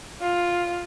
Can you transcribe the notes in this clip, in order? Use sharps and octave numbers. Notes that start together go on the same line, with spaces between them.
F4